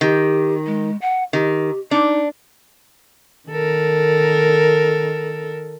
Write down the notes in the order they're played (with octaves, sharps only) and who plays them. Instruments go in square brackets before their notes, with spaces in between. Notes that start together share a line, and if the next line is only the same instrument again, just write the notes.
[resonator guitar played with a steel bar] D#3 [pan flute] G4
[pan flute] G#3
F#5
[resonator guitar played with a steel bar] D#3 [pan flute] G4
[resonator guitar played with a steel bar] D4 [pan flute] D#4
[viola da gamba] D#3 A4 A#4